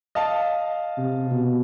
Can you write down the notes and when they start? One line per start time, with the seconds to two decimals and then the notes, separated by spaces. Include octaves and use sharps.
0.15 D#5 F5 A5
0.98 C3
1.31 B2